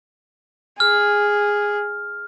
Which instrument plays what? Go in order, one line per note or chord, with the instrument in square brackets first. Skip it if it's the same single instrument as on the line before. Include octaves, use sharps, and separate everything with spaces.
[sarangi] G#4 [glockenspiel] F6